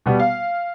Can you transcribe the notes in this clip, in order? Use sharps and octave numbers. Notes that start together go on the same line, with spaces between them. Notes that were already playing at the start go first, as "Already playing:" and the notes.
B2 G3 B3
F5